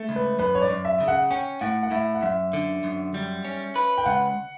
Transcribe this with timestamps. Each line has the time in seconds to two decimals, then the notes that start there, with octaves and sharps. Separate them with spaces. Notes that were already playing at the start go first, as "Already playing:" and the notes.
Already playing: A3
0.09 C#2
0.16 B4
0.39 F#2 B4
0.55 C#5
0.62 D5
0.70 F#2
0.85 E5
1.00 C#3
1.08 F#5
1.31 C#4 G5
1.61 A2 F#5
1.83 F#5
1.91 A2 E5
2.14 F#5
2.22 F#2 E5
2.53 D3
2.84 F#2
3.14 G3
3.45 C#4
3.76 B4
3.98 G5
4.06 C#2 F#5